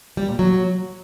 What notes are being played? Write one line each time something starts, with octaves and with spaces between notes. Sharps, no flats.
G3
A#2
F#3